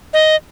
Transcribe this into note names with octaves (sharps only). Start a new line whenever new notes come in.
D#5